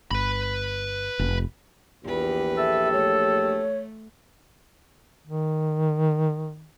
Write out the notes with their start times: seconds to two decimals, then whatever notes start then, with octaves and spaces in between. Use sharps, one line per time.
0.11 G1 B4 B5
1.19 F1
2.04 A#1 E2 G4 B4
2.57 A4 E5
2.93 A3 C#5
5.27 D#3